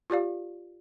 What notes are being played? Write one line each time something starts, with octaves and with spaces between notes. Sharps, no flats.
F4 G4 D5 F5